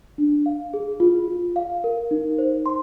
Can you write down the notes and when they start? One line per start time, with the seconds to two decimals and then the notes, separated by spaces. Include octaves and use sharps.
0.18 D4
0.46 F5
0.74 G#4
1.00 F4
1.28 F4
1.56 F5
1.84 A#4
2.11 D#4
2.38 C5
2.66 C6